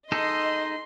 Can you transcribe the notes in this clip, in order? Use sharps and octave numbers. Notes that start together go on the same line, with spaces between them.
D#4 G#4 A4 D#5 C6